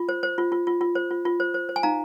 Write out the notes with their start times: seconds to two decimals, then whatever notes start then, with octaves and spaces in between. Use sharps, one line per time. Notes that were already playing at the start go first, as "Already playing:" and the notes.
Already playing: F4
0.09 C5
0.23 C5
0.38 F4
0.52 F4
0.67 F4
0.81 F4
0.95 C5
1.11 F4
1.25 F4
1.40 C5
1.54 C5
1.69 C5
1.76 G#5
1.83 D#4 F5 A#5